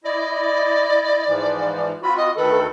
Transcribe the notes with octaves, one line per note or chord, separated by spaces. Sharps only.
E4 D5 D#5
G#2 E3 F3
C4 F4 F#4 B5
D#5
D2 D#3 A4 B4